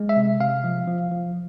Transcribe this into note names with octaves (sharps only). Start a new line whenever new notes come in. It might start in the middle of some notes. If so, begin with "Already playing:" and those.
Already playing: G#3
E5
C3
C3 F5
F3
F3
F3